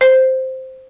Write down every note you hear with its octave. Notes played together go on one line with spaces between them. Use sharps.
C5 C7